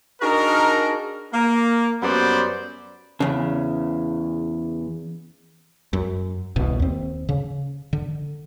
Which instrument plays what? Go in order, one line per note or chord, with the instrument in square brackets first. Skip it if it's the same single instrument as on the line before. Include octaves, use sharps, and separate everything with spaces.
[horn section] D4 D#4 F#4 G#4 A#4
A#3
F#2 F#3 G3 B3 C5 D5
[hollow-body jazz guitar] E2 C#3
[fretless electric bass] F#2
D#1 C2 B2
D#2 C4
C#3
D3